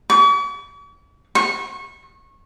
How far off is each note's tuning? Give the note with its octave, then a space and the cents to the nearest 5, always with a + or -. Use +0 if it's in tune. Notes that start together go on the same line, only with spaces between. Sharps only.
C#6 +45
C#6 -25